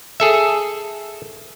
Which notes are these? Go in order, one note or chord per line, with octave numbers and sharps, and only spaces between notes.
G#4 A4 E5